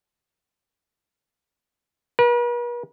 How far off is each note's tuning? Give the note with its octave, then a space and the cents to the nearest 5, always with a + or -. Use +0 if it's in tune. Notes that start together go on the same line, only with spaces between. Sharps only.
B4 -45